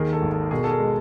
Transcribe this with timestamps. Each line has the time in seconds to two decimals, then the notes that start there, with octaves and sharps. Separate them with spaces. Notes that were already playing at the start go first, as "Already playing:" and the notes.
Already playing: D#2 D#3 G#4 A#4
0.13 A4
0.22 G#1
0.32 A4
0.51 B2 G#4 A#4
0.64 A4
0.70 G#4 A#4
0.80 G#3